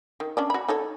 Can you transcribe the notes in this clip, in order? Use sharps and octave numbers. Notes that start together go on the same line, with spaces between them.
D#3
C#4 D4 D5
F#4 B5
D#4 A4 C#5